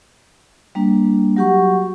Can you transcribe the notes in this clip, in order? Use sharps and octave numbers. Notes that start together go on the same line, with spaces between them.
G3 A#3 D4
F#3 F#4 G4 F#5 C#6